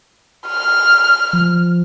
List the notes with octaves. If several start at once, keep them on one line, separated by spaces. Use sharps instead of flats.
F6
F3